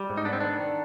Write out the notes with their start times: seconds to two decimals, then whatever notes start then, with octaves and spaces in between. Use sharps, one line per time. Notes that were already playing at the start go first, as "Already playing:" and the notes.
Already playing: G3
0.10 G#2
0.18 D#4
0.25 B3 D4
0.33 C4
0.40 D#3 D4
0.60 D#3